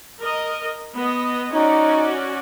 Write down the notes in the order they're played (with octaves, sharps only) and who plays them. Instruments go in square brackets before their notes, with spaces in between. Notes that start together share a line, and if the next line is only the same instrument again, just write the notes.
[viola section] A#4 D#5
B3 D#5
[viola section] C#4 F#4 D5 [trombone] D#4